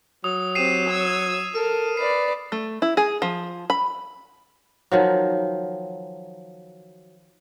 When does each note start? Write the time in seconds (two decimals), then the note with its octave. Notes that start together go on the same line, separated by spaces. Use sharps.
0.24 F#3 D#6
0.55 C4 G4 C7 D#7 E7
0.89 E6 G#6
1.54 A4 A#4
1.97 B4 D5 C7
2.52 A3
2.82 E4
2.97 G#4
3.22 F3
3.70 B5
4.91 D#3 F3 F#3